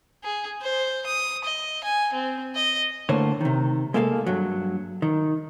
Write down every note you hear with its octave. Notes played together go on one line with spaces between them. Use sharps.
G#4
C5
D#6
D#5
G#5
C4
D#5
A2 D3 A#3 C5 C#5
C3 D#3
G#3 A#3 A4 E5 F5
G2 F#3
D#3